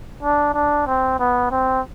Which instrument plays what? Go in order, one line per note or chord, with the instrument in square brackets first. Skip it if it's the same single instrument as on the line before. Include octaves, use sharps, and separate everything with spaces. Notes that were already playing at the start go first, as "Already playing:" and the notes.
[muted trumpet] D4
D4
C4
B3
C4